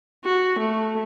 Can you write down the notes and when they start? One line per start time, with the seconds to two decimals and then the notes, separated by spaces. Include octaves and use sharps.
0.25 F#4
0.59 A3